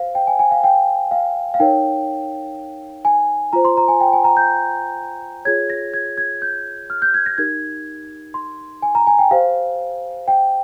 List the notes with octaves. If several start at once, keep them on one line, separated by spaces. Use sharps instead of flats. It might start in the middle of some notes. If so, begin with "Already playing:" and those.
Already playing: G4 C5 F5
G5
G#5
G#5
F5
G5
F5
F5
D#4 A#4 C#5 G5
G#5
F4 C5 A#5
C6
A#5
G#5
G5
G#5
A#5
G6
F4 G#4 C#5 G#6
A#6
G#6
G#6
G6
F6
G6
G#6
A#6
D#4 G4 A#4 G#6
C6
G#5
A#5
G#5
G5
G4 C5 F5
G5